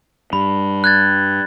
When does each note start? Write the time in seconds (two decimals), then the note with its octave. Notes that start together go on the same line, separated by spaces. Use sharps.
0.33 G2 B5
0.84 F#6 G#6 A6